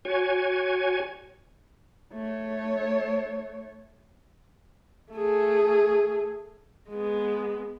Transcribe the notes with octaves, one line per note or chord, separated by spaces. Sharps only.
F#4 C#5 G#5
A3 C#5
A3 G#4
G#3 B3